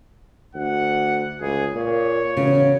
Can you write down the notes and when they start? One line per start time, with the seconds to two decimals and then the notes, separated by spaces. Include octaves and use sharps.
0.55 D2 F#5
1.41 C#2 G#4
1.75 A#2 C#5
2.37 E1 C#3